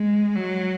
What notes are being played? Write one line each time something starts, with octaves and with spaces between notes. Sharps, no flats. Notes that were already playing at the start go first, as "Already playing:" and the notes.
Already playing: G#3
F#3